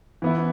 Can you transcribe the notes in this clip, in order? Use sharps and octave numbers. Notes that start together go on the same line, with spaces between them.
E3 B3 E4